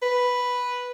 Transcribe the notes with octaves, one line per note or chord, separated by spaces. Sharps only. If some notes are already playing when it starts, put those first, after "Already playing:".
B4